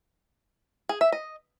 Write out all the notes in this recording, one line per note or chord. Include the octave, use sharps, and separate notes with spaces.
G#4
E5
D#5